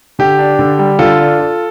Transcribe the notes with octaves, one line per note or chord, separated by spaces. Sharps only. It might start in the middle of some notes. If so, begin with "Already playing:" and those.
D3 G4
D4
D3
G3
D3 F4 A4
D4
F4